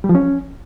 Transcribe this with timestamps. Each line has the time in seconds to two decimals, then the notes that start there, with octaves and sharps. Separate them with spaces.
0.04 G3
0.09 F3
0.15 C#4